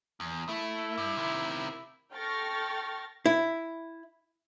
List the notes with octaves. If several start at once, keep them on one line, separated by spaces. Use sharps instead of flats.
E2
A3 E4
G2
C3 D#3
A4 G5 C#6 F6 A6 A#6
E4